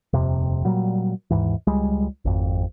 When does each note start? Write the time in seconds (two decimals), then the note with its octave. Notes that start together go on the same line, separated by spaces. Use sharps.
0.13 D#1 F2 C3
0.65 A#2 F#3 G3
1.30 D#2 G#2 E3
1.67 C#2 G3 G#3
2.25 G#1 F2